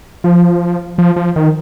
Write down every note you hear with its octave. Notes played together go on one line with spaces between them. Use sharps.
F3
F3
F3
D#3